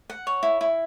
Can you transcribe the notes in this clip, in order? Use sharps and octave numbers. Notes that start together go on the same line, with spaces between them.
F#5
C#5
E4
E4